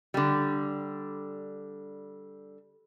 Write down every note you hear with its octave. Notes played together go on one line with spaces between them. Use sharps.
D3 G3